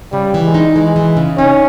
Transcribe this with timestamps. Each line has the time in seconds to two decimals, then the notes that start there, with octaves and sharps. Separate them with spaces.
0.13 C#3 G3
0.34 E3
0.44 G#3
0.54 D#4
0.76 E3 G#3
0.96 E3
1.17 C#3
1.38 C#4 D#4